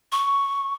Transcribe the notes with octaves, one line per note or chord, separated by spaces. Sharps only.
C#6